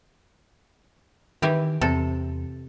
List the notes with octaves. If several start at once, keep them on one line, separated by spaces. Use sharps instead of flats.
D#3 E3 E4 G4
E2 C3 A4